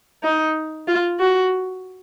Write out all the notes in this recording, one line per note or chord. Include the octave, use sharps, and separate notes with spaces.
D#4
F4
F#4